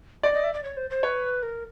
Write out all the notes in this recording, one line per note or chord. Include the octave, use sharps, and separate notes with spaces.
D5 D#5
D#5
E5
D5
C#5
C5
C5
B4 C#5
A#4